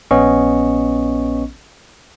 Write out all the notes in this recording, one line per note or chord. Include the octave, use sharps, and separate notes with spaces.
A#1 B3 C#4 D#5 C#6